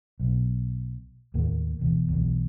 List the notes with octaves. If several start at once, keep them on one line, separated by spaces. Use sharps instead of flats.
B1
D#2 A2 A#3
E1 E2
B1 E2